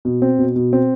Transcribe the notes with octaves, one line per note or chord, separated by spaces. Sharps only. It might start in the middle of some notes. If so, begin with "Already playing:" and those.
B2
C4
B2
B2
C4